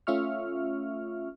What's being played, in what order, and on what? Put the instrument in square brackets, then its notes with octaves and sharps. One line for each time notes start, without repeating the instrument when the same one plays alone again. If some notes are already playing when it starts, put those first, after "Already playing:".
[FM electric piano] A3 C#4 F4 E5 C#6 F6